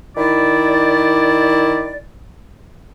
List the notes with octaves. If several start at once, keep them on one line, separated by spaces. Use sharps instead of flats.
D#3 E4 D5